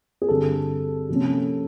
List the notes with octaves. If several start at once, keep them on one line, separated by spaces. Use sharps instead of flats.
G#4
G2 D3 G3 C4 A4
C3 F3 A#3 C#4